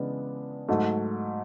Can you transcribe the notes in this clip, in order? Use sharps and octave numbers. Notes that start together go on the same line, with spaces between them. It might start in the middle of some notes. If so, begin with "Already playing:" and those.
Already playing: C#3 E3 G#3 B3 D4
G#2 F#3 A3